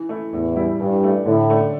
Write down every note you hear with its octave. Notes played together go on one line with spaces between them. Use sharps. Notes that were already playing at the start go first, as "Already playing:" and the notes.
Already playing: E3
A3 E4
E2 A2
G3 E4
G2 E3
A3 D4
A2 D3
A3 D4